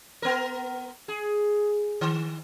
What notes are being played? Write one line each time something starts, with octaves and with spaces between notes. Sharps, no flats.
B3 A#4
G#4
D#3